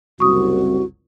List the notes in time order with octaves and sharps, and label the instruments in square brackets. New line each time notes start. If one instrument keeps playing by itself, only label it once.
[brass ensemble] F#1 C2 [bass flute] F#4 [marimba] C#6 D#6